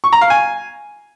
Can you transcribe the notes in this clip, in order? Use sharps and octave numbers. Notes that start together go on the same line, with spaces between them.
C#6
A#5
F5
G#5